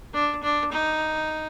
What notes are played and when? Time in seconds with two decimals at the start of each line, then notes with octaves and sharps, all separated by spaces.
0.14 D4
0.43 D4
0.72 D#4